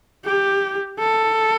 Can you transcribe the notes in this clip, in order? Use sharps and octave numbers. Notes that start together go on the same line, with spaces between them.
G4
A4